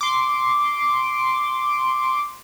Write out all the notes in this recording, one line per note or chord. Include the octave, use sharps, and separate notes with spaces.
C6 D6